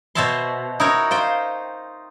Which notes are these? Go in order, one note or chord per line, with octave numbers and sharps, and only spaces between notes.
B2 C5 C#5 E5 A5 C6
D#4 E4 F#4 A#4 C#5
F4 C5 C#5 G5